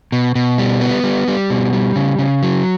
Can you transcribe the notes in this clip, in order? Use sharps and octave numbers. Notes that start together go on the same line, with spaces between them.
B2
B2
G3
B3
G3
G3
B2
G3
C#3
C#3
F#3